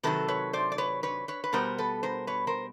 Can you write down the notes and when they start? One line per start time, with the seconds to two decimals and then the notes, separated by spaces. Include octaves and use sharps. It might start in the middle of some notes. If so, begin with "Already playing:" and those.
0.03 C3 D#3 F#3 A4 B4
0.28 B4 C#5
0.53 C5 D5
0.72 D5
0.78 B4 C#5
1.03 B4 C#5
1.28 B4 C#5
1.44 B4
1.53 B2 G3 B3 A#4 C5
1.78 A4 B4
2.03 A#4 C5
2.27 B4 C#5
2.47 A#4 C5